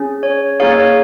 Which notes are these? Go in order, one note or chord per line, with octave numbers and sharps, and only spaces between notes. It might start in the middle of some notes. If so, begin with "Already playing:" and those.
Already playing: C#4 G#4
C#5
A#3 D#4 G#4 C#5 F5
C#5